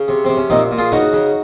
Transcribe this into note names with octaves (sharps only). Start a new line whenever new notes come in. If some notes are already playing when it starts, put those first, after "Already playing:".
Already playing: C#3
C3
C3 C4
C#4
A#2 C4 D#4
A#2
F4 G#4
C#3 D#4 F#4
C#3